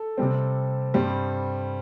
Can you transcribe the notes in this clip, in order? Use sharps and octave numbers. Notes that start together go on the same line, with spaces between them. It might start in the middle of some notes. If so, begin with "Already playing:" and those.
Already playing: A4
C3 G3 C4
G2 G3 C4 C5